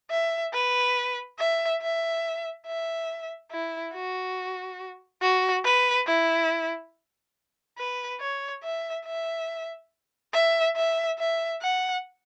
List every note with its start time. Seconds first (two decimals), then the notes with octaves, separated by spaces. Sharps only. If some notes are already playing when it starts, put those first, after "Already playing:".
0.11 E5
0.53 B4
1.39 E5
1.82 E5
2.67 E5
3.51 E4
3.94 F#4
5.22 F#4
5.65 B4
6.07 E4
7.78 B4
8.20 C#5
8.63 E5
9.06 E5
10.34 E5
10.76 E5
11.19 E5
11.62 F#5